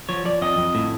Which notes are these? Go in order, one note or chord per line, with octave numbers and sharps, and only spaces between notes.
F3 C#5
F3 D5
F2 D#5
F2
A2